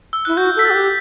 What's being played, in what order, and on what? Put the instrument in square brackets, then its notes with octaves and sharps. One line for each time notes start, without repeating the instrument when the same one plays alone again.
[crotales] E6
[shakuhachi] E4 [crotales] F#6
[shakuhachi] F#4 [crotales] G6
[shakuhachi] A4 [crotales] B6
[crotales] A6
[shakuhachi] F#4
G4